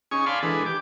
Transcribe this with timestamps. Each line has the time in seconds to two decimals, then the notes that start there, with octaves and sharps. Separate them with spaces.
0.11 C#4 D#4 G#4 G#5 C#6
0.26 D5 F5 G#5 A5 B5 C6
0.43 E3 G#3 D4 G#4 A4 B4
0.66 G4 D6